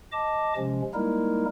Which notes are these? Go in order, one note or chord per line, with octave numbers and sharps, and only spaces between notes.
D#5 A5 D6
C3 F3 G#3 C#4
G3 G#3 A#3 D#4 E4 A#4